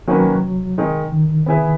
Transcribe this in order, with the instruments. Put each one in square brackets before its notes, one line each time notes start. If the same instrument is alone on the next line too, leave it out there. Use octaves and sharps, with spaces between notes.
[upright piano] D#3 A#3 C#4 F#4 B4 [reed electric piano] F#3
[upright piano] D#3 G#3 D#4
[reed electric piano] D#3
[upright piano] B3 E4 G#4 B4 E5